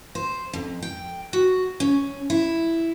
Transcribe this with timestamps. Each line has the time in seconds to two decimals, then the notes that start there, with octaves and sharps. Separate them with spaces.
0.15 C5
0.53 F2
0.82 G5
1.33 F#4
1.80 C#4
2.30 E4